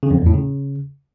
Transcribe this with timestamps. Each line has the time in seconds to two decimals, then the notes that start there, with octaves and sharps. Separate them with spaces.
0.03 C#3
0.11 F2
0.18 E2
0.26 A2
0.34 C#3